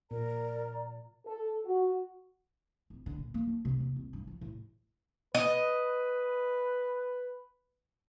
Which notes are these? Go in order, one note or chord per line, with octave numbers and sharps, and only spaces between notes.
A#2 A#4 D5 A#5
A4
F#4
D1
D3
A#2
A#3
F3
C3
D#2
C2
G2
F3
A2
B4 D#5